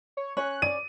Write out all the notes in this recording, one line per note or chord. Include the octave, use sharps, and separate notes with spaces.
C#5
C#4 C#5 F#6
D5 D#7